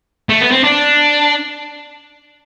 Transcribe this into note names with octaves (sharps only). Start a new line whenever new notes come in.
A3
B3
C4
D4